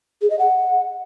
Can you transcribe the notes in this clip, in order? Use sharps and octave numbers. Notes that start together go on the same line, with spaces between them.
G#4
D#5
F#5